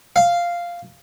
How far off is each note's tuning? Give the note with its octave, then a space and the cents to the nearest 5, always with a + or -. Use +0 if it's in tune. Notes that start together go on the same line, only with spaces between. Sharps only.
F5 -5